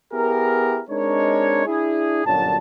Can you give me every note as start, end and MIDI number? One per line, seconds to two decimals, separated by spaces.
0.13 0.82 59
0.13 0.82 64
0.13 0.82 67
0.13 0.82 68
0.13 0.82 70
0.90 1.64 56
0.90 1.64 60
0.90 1.64 62
0.90 1.64 63
0.90 1.64 70
0.90 1.64 73
1.67 2.24 62
1.67 2.24 64
1.67 2.24 68
2.25 2.57 31
2.25 2.57 42
2.25 2.57 46
2.25 2.57 54
2.25 2.57 62
2.25 2.57 81